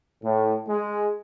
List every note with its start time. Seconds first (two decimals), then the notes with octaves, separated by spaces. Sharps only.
0.24 A2
0.68 G#3